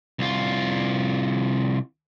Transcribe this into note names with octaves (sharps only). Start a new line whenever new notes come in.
C2 F4